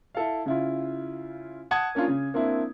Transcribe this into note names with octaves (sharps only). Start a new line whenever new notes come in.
E4 A4 F5
C#3 E4 F4
F#5 A5 D#6 G#6
A#3 C#4 D4 F4
C#3
A#3 C4 D4 E4